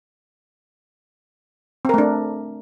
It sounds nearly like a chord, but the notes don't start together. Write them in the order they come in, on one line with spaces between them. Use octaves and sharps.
C4 A#4 A3 D4